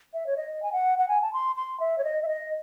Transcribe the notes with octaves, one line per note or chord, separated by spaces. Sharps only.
E5
C#5
D#5
G#5
F#5
F#5
G#5
A5
C6
C6
E5
C#5
D#5
E5
D#5